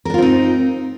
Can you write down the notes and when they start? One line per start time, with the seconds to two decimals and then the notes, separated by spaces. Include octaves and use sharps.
0.05 A#4
0.10 D4
0.14 F4
0.18 C4
0.22 D#4